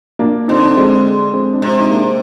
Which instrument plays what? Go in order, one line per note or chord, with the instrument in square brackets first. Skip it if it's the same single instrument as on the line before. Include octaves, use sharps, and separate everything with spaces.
[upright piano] A#3 D4
[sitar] D3 [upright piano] C4 D#4
[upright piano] D4
G#3 C4
G#3 C4
D4
[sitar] C3 [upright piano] G#3 C4
[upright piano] D#4
A#3 D4